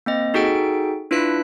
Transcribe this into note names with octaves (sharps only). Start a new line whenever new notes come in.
A#3 C4 D#5
D#4 F#4 G#4 A4 G5 D7
D4 E4 F4 B4 F#6 B6